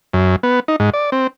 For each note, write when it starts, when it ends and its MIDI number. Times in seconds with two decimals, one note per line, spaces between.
0.13 0.36 42
0.43 0.60 59
0.68 0.76 63
0.80 0.90 44
0.93 1.10 74
1.12 1.27 60